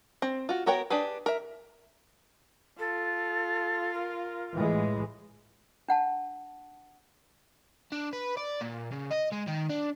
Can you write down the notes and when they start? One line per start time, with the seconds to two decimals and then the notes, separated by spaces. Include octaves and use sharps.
0.22 C4
0.49 F4 F#4
0.66 B3 F#4 A#4 C#5 G5
0.90 D4 G4 G#4 B4
1.26 A#4 E5
2.79 F4 A4
3.94 A#4
4.54 A2 E3 G#3
5.88 D4 F#5 A5
7.92 D4
8.13 B4
8.37 D5
8.61 A#2
8.92 C#3
9.11 D#5
9.33 G#3
9.48 D#3
9.69 D4